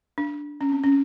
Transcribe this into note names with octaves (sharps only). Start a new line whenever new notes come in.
D4
C#4
C4
C#4